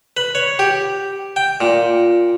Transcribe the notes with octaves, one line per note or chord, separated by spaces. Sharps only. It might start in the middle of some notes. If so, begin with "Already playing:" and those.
B4
C#5
G4
G5
A#2